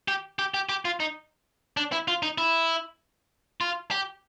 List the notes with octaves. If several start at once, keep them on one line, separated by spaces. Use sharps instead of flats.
G4
G4
G4
G4
F4
D#4
D4
E4
F4
D#4
E4
F4
G4